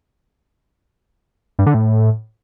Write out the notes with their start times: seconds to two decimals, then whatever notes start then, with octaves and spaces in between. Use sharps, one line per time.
1.59 G2
1.66 D3
1.74 A2